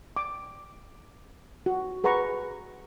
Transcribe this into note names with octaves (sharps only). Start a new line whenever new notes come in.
D6
F#4
G#4 B4 F#5 A#5 C#6